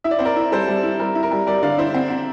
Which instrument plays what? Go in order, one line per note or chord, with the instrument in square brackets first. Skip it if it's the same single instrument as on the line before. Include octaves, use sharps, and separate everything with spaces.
[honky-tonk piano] E4 [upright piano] E5
[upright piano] D5
[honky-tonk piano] C4 [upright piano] C5
[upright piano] A#4 D5
[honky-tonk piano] E4
[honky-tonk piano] G3 [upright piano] A4 C5
[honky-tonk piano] G3
E4
[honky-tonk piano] G3 [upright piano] A#4
[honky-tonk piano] E4
[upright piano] A#4
[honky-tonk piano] G3
[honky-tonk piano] G3 [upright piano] A#4 D5
[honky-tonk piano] D3 [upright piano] D5 F5
[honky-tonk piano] E4 [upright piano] C5 E5
[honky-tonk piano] C4
C4